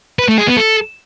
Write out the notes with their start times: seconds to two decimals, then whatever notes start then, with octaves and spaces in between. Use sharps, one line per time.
0.19 B4
0.28 A3
0.38 G#4
0.47 B3
0.57 A4